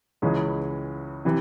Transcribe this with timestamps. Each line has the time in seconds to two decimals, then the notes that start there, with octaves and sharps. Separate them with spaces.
0.22 C#2 C#3 E3 G#3 C#4
1.25 C3 E3